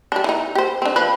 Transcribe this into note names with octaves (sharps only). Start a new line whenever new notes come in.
G3 D4
E3 D#4
G4 C5
C4 D4
F3 B4